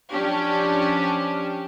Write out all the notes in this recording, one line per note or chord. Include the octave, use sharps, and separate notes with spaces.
F3 C#4 D4 G4